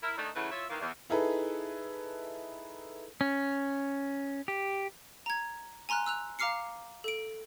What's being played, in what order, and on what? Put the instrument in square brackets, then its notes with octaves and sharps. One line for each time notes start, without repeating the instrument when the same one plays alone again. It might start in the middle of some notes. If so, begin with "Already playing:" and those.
[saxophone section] E4 A#4
D#3 A3 D4 D#4
C#3 E3 F#3 A3 E4 B4
E4 F4 C#5 E5
D#3 E3 A#3
E2
[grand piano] D#4 E4 G#4 A4 B4
[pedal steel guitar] C#4
G4
[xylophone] A#5 G#6
G#5 A#5 C6 F6 F#6
E6 F#6 F7
F5 A#5 D6 F6 C7 C#7
A4 D7